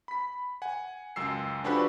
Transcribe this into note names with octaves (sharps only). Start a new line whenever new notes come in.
B5 B6
F#5 G#5
C#2 F#2 E6 C7
F3 D4 F#4 G4 A4 B4